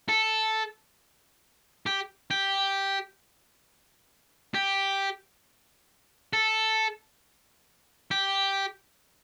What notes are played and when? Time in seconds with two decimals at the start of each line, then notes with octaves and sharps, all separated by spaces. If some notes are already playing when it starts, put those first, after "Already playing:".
0.09 A4
1.86 G4
2.31 G4
4.55 G4
6.33 A4
8.11 G4